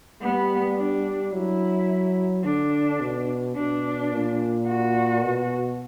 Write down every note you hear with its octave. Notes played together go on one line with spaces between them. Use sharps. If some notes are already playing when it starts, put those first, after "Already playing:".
G3 B3
D4
F#3 E4
D3 D4
B2
B2 D4
A#2
F#4
B2